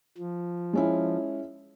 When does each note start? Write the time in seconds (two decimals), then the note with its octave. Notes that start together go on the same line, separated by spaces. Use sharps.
0.18 F3
0.73 G#3 C#4 E4